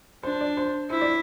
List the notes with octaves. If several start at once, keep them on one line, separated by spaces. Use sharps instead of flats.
D4 C5
D5
C5
E4 C5
D5